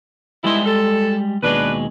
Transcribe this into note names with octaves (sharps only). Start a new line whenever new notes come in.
G3 G#3 B3 D#4 E4 C6
A4
D#2 B2 G#3 D4 B4